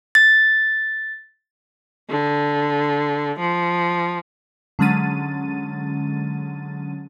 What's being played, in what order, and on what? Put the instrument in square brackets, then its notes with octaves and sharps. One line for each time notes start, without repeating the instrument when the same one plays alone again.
[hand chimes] A6
[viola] D3
F3
[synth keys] D3 F#3 G#3 C#4 A6 D#7